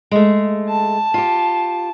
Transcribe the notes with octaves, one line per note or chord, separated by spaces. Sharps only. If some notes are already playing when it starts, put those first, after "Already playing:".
G#3 A3
A5
F4 G4